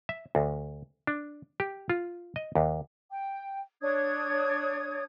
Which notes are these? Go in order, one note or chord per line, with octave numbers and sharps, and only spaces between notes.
E5
D2
D4
G4
F4
D#5
D#2
G5
D4 C#5 D#6 G#6